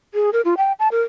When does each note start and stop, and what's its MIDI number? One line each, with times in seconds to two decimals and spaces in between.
0.14 0.30 68
0.33 0.41 70
0.45 0.54 65
0.57 0.72 79
0.79 0.88 81
0.92 1.01 70